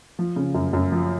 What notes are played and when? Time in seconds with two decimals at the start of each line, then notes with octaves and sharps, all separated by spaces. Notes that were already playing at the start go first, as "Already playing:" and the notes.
0.19 F3
0.36 C#3
0.55 F#2
0.73 F#2
0.92 F3